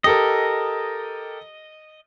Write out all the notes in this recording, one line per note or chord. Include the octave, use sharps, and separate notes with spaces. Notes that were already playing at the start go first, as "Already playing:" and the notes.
G4 A4 A#4 D#5